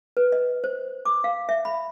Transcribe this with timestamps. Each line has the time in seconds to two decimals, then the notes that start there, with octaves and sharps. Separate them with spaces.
0.17 B4
0.32 D#5
0.64 C5
1.05 D6
1.24 F5
1.49 E5
1.65 B5